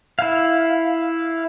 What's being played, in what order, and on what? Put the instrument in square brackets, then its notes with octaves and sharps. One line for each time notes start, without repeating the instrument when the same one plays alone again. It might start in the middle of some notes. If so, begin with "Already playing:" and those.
[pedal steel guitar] E4 F5